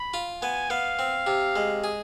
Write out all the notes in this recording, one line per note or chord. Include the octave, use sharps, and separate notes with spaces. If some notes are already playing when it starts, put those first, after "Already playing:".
Already playing: B5
F4
B3 G#5
B3 F5
C4
C3
G#3
G#4